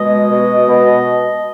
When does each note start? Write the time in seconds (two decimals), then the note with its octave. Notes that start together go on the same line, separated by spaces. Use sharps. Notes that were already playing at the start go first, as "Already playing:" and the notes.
Already playing: B2 G#3 D#5
0.30 B2
0.67 B2